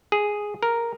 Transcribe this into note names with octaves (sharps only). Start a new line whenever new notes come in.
G#4
A#4